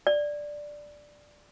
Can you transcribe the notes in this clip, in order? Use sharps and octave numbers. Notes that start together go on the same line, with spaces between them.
D5